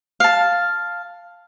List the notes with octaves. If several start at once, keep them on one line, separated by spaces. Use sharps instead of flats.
F5 A5